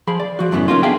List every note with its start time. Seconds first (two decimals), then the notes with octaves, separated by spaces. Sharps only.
0.07 F3 G#4 B5
0.20 D5
0.39 F3 F#4
0.52 F#2 A2 C#3 E3 B3
0.68 A#3 C#4 D#4 F4
0.83 B3 D4 G#4 E5 F5 G5